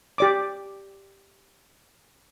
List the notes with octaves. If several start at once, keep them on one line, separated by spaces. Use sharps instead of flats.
G4 D5 D6